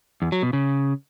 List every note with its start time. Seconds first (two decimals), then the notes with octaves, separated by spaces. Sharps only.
0.22 E2
0.32 F#3
0.43 B2
0.53 C#3